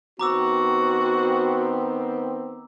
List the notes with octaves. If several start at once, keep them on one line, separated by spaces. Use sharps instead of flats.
D#3 B3 C4 F#4 A#5 D6 E6